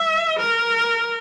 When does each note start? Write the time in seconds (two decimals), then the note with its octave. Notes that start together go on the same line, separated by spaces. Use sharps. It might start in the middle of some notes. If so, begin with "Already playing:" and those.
Already playing: E5
0.39 A#4